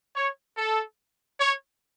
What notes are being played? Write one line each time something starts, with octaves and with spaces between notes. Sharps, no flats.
C#5
A4
C#5